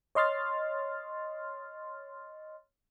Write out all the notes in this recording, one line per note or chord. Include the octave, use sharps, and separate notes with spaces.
C#5 D#5 C6 F6 A6